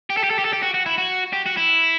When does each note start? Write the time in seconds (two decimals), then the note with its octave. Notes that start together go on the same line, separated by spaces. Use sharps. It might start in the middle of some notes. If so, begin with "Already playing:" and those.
0.10 G4
0.17 A4
0.24 G4
0.30 A4
0.39 G4
0.45 A4
0.53 G4
0.63 F#4
0.74 F#4
0.86 E4
0.98 F#4
1.33 G4
1.46 F#4
1.57 E4